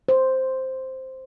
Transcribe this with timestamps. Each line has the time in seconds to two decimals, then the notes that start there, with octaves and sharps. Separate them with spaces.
0.09 C5